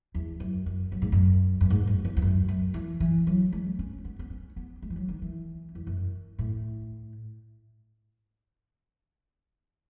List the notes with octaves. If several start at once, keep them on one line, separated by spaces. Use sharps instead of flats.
E2
F#2
F#2
F#2
G#2
F#2
F#2
G#2
F#2
E2
E2
F#2
F#2
E3
E3
F#3
G#3
C#4
B3
B3
C#4
B3
G#3
E3
F#3
D#3
E3
E2
F#2
A2